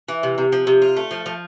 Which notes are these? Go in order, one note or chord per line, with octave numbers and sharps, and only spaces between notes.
E3
C3
C3
F3
C3
F4
A3
F3
F3